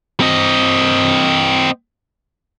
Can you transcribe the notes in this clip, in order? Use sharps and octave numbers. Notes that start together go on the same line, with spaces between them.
C4 D#5